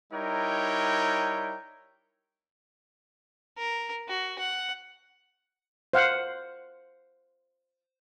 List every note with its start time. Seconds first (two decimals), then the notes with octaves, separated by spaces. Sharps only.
0.13 G3 D#4 E4 A#4 C#5 G5
3.58 A#4
4.08 F#4
4.39 F#5
5.93 C5 F5 F#5